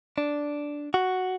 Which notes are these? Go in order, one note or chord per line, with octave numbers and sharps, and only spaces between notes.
D4
F#4